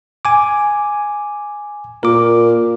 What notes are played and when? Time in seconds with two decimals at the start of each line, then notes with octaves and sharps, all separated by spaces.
0.25 G#5 D6
2.03 A#2 A#4 D6